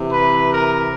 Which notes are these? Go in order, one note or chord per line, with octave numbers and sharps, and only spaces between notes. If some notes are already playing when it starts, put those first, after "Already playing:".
Already playing: C3 E3
B4
A#4